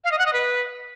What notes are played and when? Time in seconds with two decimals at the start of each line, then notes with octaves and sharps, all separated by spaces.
0.04 F5
0.12 D#5
0.19 F#5
0.26 D#5
0.33 B4